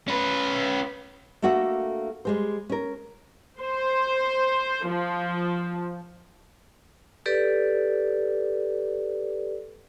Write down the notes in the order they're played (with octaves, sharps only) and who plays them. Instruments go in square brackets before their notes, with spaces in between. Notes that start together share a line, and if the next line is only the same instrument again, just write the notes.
[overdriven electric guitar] C#4 B4
[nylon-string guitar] A3 A#3 D4 F#4 A4 E5
G3 G#3 C5
C#4 A#4
[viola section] C5
F3
[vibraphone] G4 A4 B4 D5